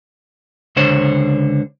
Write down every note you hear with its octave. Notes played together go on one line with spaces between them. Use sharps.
C#2 D3 C5 C#5